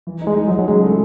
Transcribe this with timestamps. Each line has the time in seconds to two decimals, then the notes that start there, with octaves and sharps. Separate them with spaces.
0.07 E3
0.21 D#4
0.27 G#3
0.37 D#4
0.48 F#3
0.52 D#4
0.59 F#3
0.68 C#3 G#3
0.84 A3